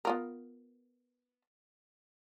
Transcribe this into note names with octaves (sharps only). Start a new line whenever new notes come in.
B3 F4 A#4